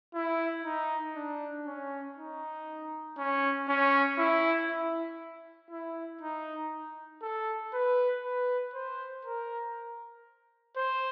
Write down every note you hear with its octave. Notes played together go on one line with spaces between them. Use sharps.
E4
D#4
D4
C#4
D#4
C#4
C#4
E4
E4
E4
D#4
A4
B4
B4
C5
A#4
C5